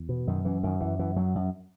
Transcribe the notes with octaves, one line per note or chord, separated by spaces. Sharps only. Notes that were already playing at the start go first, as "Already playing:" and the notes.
Already playing: E2
B2
F#2 D#3
F#2 E3
F#2 D#3
F#2 E3
F#2 E3
F#2 F#3
F#2